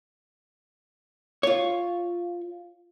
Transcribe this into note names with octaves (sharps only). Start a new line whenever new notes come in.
F4 C#5